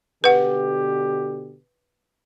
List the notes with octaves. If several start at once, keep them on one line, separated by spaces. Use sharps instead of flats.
B2 D3 G4 B4 F#5